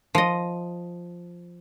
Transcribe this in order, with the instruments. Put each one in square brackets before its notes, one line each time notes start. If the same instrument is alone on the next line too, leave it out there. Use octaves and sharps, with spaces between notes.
[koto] F3 D#5